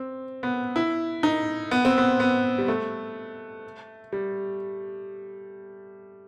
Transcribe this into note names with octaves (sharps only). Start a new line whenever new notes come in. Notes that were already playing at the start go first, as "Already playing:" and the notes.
Already playing: C4
B3
E4
D#4
B3
C4
B3
B3
G3
A3
G3